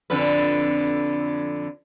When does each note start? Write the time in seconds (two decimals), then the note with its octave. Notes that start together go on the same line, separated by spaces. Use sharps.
0.10 F2 D3 B4